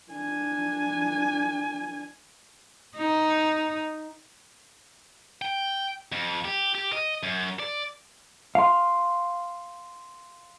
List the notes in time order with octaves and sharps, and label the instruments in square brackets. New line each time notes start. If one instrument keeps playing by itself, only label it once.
[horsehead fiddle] D4 G#5
[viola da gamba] D#4
[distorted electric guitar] G5
F2
G4
G4
D#5
F#2
D5
[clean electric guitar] F5 C6